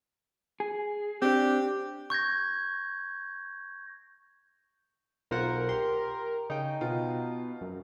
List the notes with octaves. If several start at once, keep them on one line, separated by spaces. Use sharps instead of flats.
G#4
C4 D4 G4
C#6 G6 G#6 A#6
B1 F4 A#4 C5 F#5
G4 C6
C#3 D#4 G5
B2 F4
F#2